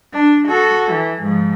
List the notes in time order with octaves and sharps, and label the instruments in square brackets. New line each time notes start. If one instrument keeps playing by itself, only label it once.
[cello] D4
F#4 A4
E3
G#2 F3